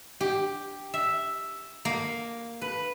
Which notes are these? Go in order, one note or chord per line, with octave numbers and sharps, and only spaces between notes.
G4
E5
A#3
B4